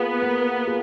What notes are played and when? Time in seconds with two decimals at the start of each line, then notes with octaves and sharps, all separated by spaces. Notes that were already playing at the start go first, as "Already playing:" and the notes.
Already playing: A#3 B3 F4 G#4 B4
0.22 A#3
0.67 F4 G#4